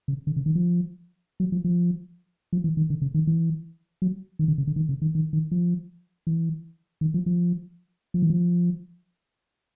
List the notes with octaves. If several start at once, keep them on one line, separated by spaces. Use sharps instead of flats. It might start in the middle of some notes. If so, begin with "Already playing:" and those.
C#3
D3
C#3
D#3
F3
F#3
F3
F3
F3
E3
D#3
D3
C#3
D#3
E3
F#3
D#3
D3
C#3
D3
D#3
C#3
D#3
D#3
D#3
F3
E3
D#3
F3
F3
F3
E3
F3